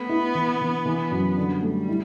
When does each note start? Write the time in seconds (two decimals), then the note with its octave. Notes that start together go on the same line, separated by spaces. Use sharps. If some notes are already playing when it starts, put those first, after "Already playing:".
Already playing: A3 B3
0.09 E4
0.35 E3
0.61 E3
0.85 E3
1.11 F#2
1.37 D3 G3
1.62 A3
1.89 E4